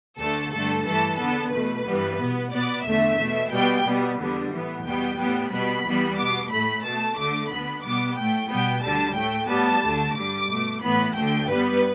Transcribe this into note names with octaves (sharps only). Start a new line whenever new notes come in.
D2 D3 A3 A4
G2 D3 A3 A4
G2 E3 A3 A4
E2 D3 B3 A4
E2 B2 A3 B4
G2 E3 G3 B3
B2 B3
B2 B3 D5
E2 D3 A3 E5
B2 A3
B2 G3 B3 G5
B2 G3 B3
E2 D3 G3 B3
A2 E3 B3
E2 B2 G3 B3 G5
A2 G3 B3
B2 G3 B3 B5
E2 E3 G3 B3
B2 B3 D6
A2 A3 B5
B2 A3 A5
D2 D3 A3 D6
D2 D3 B3 B5
B2 G3 B3 D6
A2 A3 G5
B2 G3 B3 G5
D2 D3 G3 A5
A2 A3 G5
A2 G3 B3 A5
D2 D3 A3
G2 D3 G3 D6
B2 A3
A2 E3 B3 B5
D2 D3 A3 G5
G2 G3 B3 B4